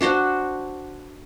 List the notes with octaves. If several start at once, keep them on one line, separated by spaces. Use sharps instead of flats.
D4 F#4 C5 F#5